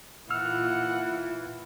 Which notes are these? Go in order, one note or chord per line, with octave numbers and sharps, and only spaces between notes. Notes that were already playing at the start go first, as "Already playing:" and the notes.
A#2 E3 F4 F#5 E6 F6